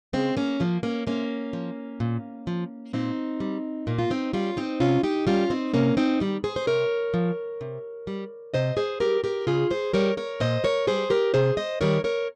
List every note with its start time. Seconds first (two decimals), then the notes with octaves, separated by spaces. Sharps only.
0.13 C#3 G#3 C4
0.37 A#3 C#4
0.60 F3 A#3
0.83 A#3 C#4
1.07 C3 A#3 C#4
1.53 F3
2.00 A#2
2.47 F3
2.93 A#2 C4 D#4
3.40 G3
3.87 A#2 A#3
3.99 F4
4.10 C4 D#4
4.33 G3 C#4 F4
4.57 C4 D#4
4.80 C3 C#4 F4
5.03 D#4 G4
5.27 G3 C#4 F4
5.50 C4 D#4
5.74 C3 A#3 C#4
5.97 C4 D#4
6.20 D#3 G3
6.44 G#4 C5
6.56 C5
6.67 C3 A#4 C#5
7.14 F3
7.61 C3
8.07 G3
8.54 C3 C5 D#5
8.77 G#4 C5
9.00 G3 G4 A#4
9.24 G4 A#4
9.47 C#3 F4 G#4
9.70 G#4 C5
9.93 G3 A#4 C#5
10.17 A#4 C#5
10.40 A#2 C5 D#5
10.64 A#4 C#5
10.87 G3 G#4 C5
11.10 G4 A#4
11.34 C3 G#4 C5
11.57 C5 D#5
11.81 D#3 G3 A#4 C#5
12.04 A#4 C#5